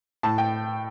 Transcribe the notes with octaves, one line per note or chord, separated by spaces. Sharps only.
A2 A5
G5